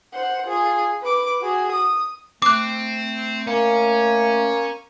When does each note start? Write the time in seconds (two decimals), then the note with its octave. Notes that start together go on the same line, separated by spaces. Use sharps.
0.13 C5 F#5
0.47 F4 G#4
1.02 B4 D6
1.41 F#4 G#4
1.73 D#6
2.42 A3 C4 D6 F#6
3.47 A#3 C#4